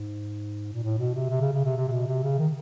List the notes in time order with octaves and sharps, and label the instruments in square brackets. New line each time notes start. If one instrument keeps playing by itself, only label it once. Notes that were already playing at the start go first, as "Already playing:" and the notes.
Already playing: [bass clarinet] G#2
A#2
A2
B2
C3
C3
C#3
C#3
C3
C3
C3
B2
C3
C#3
D#3